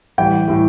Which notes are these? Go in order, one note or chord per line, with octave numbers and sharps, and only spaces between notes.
A2 E3 G3 G5
A2 E3 G3